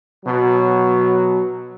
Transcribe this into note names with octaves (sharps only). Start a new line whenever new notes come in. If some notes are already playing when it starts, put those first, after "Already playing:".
B2 F#3